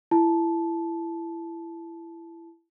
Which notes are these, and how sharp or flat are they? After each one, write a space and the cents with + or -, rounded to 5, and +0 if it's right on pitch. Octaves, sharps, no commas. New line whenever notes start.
E4 +25 A5 -15